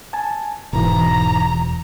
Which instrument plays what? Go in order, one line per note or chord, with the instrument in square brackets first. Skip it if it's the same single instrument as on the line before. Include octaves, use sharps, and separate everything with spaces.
[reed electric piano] G#5 A5
[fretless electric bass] E1 [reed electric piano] E2 E3 [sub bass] G#2 [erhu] A#5